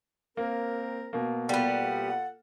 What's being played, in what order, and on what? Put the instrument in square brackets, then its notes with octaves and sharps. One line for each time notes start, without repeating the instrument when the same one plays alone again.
[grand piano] A#3 [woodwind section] C4 A#4
[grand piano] B2 A#3
[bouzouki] G3 B3 [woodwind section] F4 A4 F#5